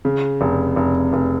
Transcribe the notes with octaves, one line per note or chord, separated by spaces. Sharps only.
C#3
F1
F1
F1